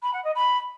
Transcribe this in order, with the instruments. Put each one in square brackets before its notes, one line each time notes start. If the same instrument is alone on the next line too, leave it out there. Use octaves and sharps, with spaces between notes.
[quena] B5
F#5
D#5
B5